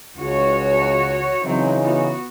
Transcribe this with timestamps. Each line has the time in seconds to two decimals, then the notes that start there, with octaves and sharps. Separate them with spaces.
0.17 C#2 F#4 C#5
1.44 C#3 E3 F#3 C4 D#4
1.80 B3 F#4